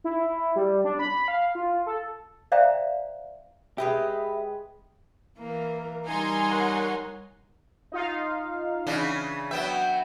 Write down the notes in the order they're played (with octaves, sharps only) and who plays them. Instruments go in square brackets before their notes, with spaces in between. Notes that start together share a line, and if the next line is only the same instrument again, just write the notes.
[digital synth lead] E4
G3
D4
B5
F5
F4
A4
[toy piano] C5 D5 E5 F5 G5 A#5
[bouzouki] G#3 B4 D#5 [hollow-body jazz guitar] G4 [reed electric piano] E5
[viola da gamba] E3 A#3 [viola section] A#4
[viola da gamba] G3 D#4 [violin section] G#5 A#5 C6
[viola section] A#4 C#5 F#5
[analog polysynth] D#4 F4 F5
[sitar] C#3 E3 D4
[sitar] F#3 B3 E5 [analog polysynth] G5